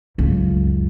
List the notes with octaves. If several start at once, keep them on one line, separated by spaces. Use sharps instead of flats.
C#2 F#2